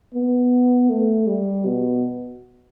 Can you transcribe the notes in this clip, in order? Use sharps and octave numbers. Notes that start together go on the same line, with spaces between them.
B3
A3
G3
B2